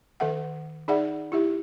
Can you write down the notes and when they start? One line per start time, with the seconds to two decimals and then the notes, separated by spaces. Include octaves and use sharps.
0.20 D#3 A4 E5 F#5
0.88 D#4 G#4 D5 E5 F#5
1.32 E4 G4 E5